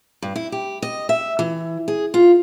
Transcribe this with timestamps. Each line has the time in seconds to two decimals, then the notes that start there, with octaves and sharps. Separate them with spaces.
0.22 G2
0.36 E4
0.52 G4
0.82 D#5
1.09 E5
1.39 E3
1.88 G#4
2.14 F4